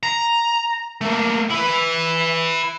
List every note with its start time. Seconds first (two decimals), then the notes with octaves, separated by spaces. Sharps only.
0.03 A#5
1.01 A3 A#3
1.50 E4 B4